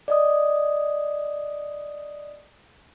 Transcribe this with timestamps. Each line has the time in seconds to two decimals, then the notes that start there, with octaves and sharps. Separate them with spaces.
0.08 D5 D#5 D#6